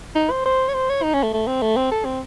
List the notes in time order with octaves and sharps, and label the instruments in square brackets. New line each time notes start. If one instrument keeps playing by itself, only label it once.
[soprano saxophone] D#4
C5
C5
C#5
C5
C#5
D#4
C#4
A3
A3
C4
A3
C4
A4
C4